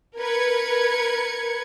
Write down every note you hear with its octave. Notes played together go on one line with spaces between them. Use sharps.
A#4 B4 G#6 C#7